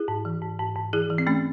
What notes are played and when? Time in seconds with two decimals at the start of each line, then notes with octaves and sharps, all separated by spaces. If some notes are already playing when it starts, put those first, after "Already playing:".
Already playing: E4 G#4
0.08 G#2
0.25 E3
0.42 G#2
0.59 G#2
0.76 G#2
0.93 E3 E4 G#4
1.10 E3
1.18 C4
1.27 E3 A3 C#4